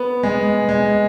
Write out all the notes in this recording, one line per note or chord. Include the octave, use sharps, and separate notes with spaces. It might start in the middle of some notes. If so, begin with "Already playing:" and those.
Already playing: B3
G#3
G#3